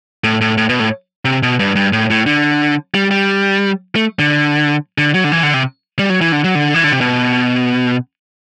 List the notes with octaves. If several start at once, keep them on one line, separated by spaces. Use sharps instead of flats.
A2
A2
A2
B2
A2
C3
B2
G2
G2
A2
A2
D3
G3
G3
A3
D3
D3
F#3
D3
E3
D3
C3
G3
F#3
E3
D3
F#3
D3
E3
D3
C3
B2